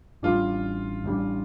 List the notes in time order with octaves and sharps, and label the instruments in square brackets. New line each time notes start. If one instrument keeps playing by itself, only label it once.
[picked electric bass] A1 A2 G3 D4 [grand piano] F4
[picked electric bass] A1 A2 G3 D4